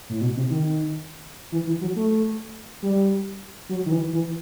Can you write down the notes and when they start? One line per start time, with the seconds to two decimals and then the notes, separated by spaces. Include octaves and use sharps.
0.09 A2
0.21 B2
0.36 C3
0.50 D#3
1.52 E3
1.67 E3
1.81 F#3
1.96 A3
2.82 G3
3.69 F#3
3.86 D#3
3.91 E3
4.13 E3